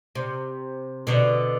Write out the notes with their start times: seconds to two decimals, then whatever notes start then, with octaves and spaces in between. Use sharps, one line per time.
0.15 C3
1.07 B2 D3